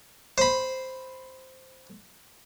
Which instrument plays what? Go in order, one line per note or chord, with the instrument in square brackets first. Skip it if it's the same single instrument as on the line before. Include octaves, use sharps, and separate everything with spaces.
[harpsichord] C5 B5